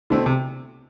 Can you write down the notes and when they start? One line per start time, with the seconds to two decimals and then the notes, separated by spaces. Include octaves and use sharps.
0.10 B2 D3 A3 C4 E4
0.26 C3